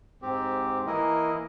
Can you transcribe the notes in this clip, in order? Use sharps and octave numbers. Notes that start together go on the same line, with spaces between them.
G#2 C4 G4
E3 A#3 E4 A#4 D#5